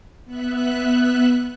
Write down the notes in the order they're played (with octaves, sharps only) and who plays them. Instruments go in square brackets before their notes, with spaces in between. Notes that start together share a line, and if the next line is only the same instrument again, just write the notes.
[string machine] B3 E5 F#6